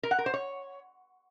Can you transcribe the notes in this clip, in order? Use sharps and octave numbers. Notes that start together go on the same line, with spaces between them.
A#4
F#5
A#4
C5
C#5